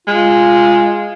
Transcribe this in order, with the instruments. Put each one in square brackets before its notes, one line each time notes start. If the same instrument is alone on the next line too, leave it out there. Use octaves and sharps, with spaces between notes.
[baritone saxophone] G#3 [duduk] F4